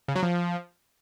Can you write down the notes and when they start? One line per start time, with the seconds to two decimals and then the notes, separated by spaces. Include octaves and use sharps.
0.08 C#3
0.16 F#3
0.23 F3